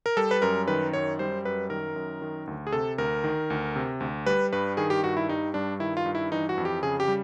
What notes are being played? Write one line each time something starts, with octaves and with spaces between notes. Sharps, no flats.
A#4
G3 A4
B4
F#2 A#4
D#3 B4
F#2 C#5
G3 C5
F#2 B4
D#3 A#4
F#2
D#3
D2
G#4
C3 A4
D2 A#4
D#3
D2
C3
D2
G3 B4
G2 B4
D#3 G#4
G4
G2 F#4
E4
G3 D#4
G2 D4
D#3 E4
F4
G2
E4
E3 D#4
F#4
F2
G4
C#3 G#4
G4
G3